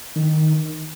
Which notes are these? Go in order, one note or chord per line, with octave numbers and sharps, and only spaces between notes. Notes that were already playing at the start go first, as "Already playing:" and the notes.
D#3